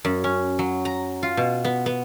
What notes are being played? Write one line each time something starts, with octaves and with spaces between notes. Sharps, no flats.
F#2
C#4
F#3
A#5
F4
B2
B3
B3